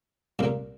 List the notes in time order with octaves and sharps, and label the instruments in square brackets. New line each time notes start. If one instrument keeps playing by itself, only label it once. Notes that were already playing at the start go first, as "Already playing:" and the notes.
[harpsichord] C2 A#2 A#3